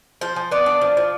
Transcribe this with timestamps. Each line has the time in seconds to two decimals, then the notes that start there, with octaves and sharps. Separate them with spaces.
0.21 F3 C5
0.36 F3
0.51 B3 D5
0.66 D4
0.81 F3
0.97 F3